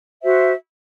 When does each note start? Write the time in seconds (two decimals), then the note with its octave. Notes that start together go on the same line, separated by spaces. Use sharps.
0.22 F#4 C5 E5